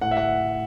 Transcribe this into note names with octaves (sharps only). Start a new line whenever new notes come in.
A2 F#5
E5
F#5